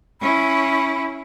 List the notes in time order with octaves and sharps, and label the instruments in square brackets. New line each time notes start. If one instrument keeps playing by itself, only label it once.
[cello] C#4 E4 [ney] B5